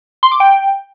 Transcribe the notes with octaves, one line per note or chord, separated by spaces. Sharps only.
C6
D6
G5